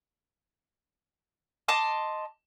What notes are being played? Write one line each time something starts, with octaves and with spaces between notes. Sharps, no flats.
D#5 A5 C6 D6